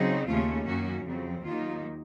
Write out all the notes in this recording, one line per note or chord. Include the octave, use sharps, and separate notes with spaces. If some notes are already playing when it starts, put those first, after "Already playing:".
Already playing: C#3 F#3 C4 D#4
D#2 C#3 A3 C#4 F4
F#2 D#3 A#3 C#4 F#4
F2 C#3 F#3 C4
D#2 D#3 F#3 A#3 D#4 F4